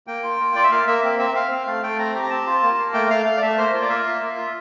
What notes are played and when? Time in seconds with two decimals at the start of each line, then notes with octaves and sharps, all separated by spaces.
0.07 A#3 G5
0.23 F4
0.40 A#3
0.55 F4 D5
0.64 E5
0.71 A#3 F5
0.87 A#3 E5
1.03 C4
1.19 C4 E5
1.35 C4 F5
1.52 C4
1.67 A3 F5
1.83 A3 G5
1.98 C4 A#5
2.15 G4
2.23 A#5
2.30 C4 A5
2.46 F4
2.63 A#3
2.79 A#3
2.94 A3 G5
3.10 A3 F5
3.26 A3 F5
3.37 D5
3.42 A3 E5
3.57 A#3 C5
3.74 F4
3.82 D5
3.89 A#3 E5
4.06 A#3
4.21 A#3
4.37 F4